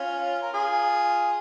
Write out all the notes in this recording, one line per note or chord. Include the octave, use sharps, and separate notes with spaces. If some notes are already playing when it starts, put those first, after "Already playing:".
Already playing: C#4 F4
A#4
F4 G#4